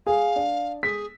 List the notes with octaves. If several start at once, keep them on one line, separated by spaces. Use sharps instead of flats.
G#4 F5
D4
G#4 B6